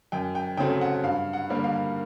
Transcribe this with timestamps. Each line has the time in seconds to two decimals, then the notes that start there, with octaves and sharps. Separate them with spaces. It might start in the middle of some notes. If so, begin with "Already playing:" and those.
0.12 F#2 G5
0.35 G5
0.57 C#3 F#3 A3 C4 G5
0.81 F#5
1.03 G2 F5
1.33 F#5
1.49 D3 G3 A#3
1.64 F5